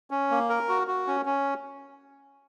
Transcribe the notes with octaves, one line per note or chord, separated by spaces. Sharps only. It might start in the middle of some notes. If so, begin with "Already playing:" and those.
C#4
A#3
A#4
F#4
F#4
C#4
C#4